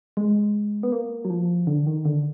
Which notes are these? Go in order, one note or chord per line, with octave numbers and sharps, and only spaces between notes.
G#3
B3
A#3
F#3
F3
D3
D#3
D3